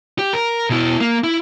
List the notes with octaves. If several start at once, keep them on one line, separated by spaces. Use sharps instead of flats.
G4
A#4
B2 E4
A#3
E4